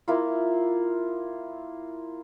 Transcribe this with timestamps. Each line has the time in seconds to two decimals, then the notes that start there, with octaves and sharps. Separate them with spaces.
0.08 A#3 E4 F4